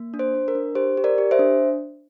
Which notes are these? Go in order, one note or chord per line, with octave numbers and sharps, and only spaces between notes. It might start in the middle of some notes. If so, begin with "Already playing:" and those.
Already playing: A#3
D4
C5
D4
A#4
D4
G4 C5
G4
A#4 D5
G4
C5 E5
D4